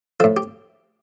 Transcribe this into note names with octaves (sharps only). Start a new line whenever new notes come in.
A2 F3 A4
G4